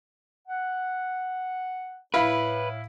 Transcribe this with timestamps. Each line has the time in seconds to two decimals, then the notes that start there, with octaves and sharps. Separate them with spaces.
0.47 F#5
2.14 A2 E4 B4 F5 B5